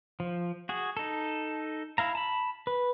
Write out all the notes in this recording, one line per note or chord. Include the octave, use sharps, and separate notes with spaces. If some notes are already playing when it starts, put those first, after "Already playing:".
F3
F#4 G#4
D#4 A4
E4 F5 A#5
A5 B5
B4